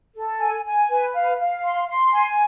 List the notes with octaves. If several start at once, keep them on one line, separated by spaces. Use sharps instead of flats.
A4
G#5
G#5
B4
F5
F5
C6
C6
G#5